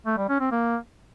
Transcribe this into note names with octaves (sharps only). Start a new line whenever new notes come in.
A3
G3
C#4
C4
A#3